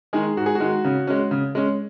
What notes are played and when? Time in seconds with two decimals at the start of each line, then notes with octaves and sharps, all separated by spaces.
0.13 D#3 G#3 G#4
0.37 G#2 F#4
0.46 G#4
0.55 F#4
0.60 D#3 G#3
0.84 C#3
1.07 G#3 C#4
1.31 C#3
1.55 G#3 C#4